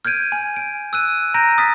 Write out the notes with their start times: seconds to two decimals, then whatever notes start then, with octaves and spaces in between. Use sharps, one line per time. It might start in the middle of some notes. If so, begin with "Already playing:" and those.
0.05 F6 G6 G#6 D7 D#7
0.32 G#5
0.56 D7
0.93 E6 F#6 D#7
1.34 A#5 G6 A#6 D7 D#7
1.58 D#6 F6 A6 B6